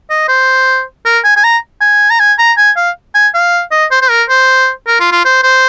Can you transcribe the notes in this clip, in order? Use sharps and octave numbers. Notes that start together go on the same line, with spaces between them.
D#5
C5
A#4
G#5
G#5
A#5
G#5
A#5
G#5
A#5
G#5
F5
G#5
F5
D#5
C5
C5
A#4
C5
A#4
F4
F4
C5
C5